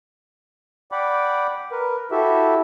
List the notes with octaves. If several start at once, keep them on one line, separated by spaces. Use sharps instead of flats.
D5 F#5 G5 B5 D6
A#4 B4
E4 F#4 G4 A4 E5